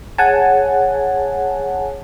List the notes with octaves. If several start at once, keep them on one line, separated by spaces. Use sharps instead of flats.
G#4 C#5 F#5 G#5 A5